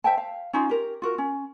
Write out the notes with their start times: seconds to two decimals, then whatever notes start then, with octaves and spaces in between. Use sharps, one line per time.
0.04 C5 E5 G5 A5
0.17 F5
0.53 C#4 D#4 F4
0.69 G4 A#4
1.02 F4 F#4 A#4
1.18 C#4